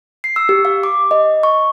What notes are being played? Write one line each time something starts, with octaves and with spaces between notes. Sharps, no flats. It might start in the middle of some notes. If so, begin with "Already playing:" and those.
C7
E6
G4
F5
D6
D#5
C#6